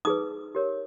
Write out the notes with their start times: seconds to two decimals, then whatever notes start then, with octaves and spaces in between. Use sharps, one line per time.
0.05 D#4 G#4 B4 D#6
0.55 G4 A#4 C#5